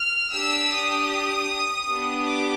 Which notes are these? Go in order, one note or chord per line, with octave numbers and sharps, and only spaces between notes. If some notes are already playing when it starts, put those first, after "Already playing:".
Already playing: F6
D4 G4 E6
D#6
B3 D4 G4
D6